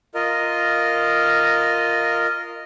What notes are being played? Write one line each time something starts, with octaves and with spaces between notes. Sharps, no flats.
F4 A#4 D#5